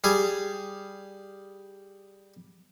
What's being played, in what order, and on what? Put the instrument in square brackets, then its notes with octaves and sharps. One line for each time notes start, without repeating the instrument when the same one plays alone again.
[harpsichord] G3 G#4